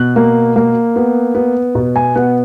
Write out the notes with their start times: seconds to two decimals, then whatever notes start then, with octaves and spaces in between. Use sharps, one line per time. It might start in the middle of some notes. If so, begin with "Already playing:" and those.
Already playing: B2 F#6
0.16 A#3
0.56 A#3
0.96 B3
1.35 B3
1.75 B2
1.96 G#5
2.15 B3 F#5